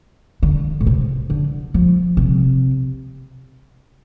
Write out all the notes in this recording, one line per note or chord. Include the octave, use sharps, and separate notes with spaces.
D3
A2
C3
D3
F3
C3